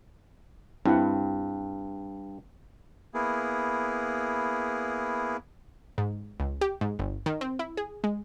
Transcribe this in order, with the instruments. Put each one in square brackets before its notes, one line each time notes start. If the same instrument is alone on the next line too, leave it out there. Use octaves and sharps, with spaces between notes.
[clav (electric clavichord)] G2 [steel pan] C4 E4 F#5
[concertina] A#3 B3 E4 G#4
[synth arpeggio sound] G#2
C#2
G4
G#2
G1
D#3
C4
E4
G#4
G#3